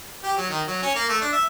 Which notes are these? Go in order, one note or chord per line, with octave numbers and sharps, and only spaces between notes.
G4
F#3
D#3
F#3
C#4
A#3
A3
D4
E5